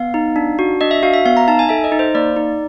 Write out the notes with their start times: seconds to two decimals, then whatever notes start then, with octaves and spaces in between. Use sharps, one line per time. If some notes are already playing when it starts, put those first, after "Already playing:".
Already playing: B3 F5
0.14 D#4
0.36 D4
0.59 F#4
0.81 D4 D#5
0.91 E5
1.03 F#4 F5
1.14 E5
1.26 B3 F5
1.37 A#5
1.48 D#4 A5
1.59 G#5
1.69 A4 E5
1.84 D#5
1.92 D#4
1.99 C5
2.15 A#3 D5
2.36 D#4